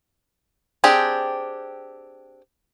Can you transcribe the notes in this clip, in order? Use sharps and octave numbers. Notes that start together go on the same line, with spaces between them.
C4 D4 G4 G#4